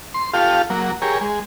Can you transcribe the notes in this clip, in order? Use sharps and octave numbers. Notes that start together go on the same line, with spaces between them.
C6
F4 G4 A4 F5
F#3 A#3
G4 G#4 A#4 C#5
G#3